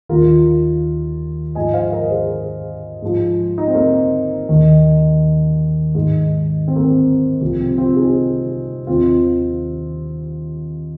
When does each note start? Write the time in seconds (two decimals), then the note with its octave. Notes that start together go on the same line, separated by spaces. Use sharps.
0.09 D#2 D#3 F4 A#4
1.55 G#2 F3 D#5 G#5
1.74 C5 F5
1.92 A#4 D#5
2.11 G#4 C5
3.02 G#2 F3
3.58 D#4
3.67 C4
3.75 A#3
4.49 D#2 D#3
5.95 G#2
6.00 D#3
6.68 C4
6.76 A#3
6.84 C4
7.41 C2 C3 F3 A#3
7.60 C4
7.78 C4 F4
7.96 D#4 G#4
8.87 D#2 D#3 C4 F4